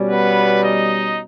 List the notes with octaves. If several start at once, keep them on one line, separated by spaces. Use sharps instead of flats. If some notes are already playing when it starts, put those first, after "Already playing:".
Already playing: B2 G3 C#4
B3 B4
D#4 D#5